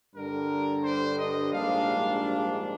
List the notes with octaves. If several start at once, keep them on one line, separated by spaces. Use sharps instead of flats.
G2 D3 G3 A#4
C5
D#5
A#1 G#2 G3 D4 F5